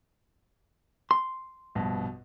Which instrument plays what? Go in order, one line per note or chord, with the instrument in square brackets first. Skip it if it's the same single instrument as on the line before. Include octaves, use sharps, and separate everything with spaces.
[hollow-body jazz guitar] C6
[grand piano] A#1 G2 B2